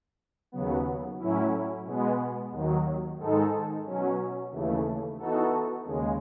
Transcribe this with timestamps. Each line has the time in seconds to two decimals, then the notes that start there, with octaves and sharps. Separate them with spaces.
0.52 D#2 C#3 F#3 B3
1.18 A2 F#3 C#4 E4
1.85 B2 G#3 B3
2.51 D#2 D#3 F#3
3.18 G#2 D#3 G#3 D#4 A4
3.85 B2 F#3 C#4
4.51 D#2 C#3 E3 A3
5.18 E3 B3 D#4 F#4 A4
5.85 D#2 C#3 G#3